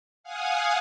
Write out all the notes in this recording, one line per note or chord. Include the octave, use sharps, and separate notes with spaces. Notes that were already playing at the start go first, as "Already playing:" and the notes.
F5 F#5 G#5 D#6